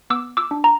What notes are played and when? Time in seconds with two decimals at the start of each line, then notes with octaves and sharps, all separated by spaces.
0.10 B3 D6 E6
0.37 D6 E6
0.51 D4
0.64 A#5